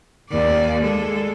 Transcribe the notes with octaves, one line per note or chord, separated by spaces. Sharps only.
D#2 D5
G#3 A4